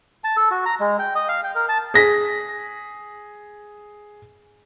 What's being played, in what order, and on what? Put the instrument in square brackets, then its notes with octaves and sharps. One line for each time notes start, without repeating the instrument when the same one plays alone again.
[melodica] A5
A4
F#4
A#5
G#3
G5
D#5
F5
G5
A#4
A5
[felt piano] G#4 A#6 B6